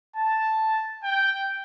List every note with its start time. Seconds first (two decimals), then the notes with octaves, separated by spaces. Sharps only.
0.16 A5
1.03 G5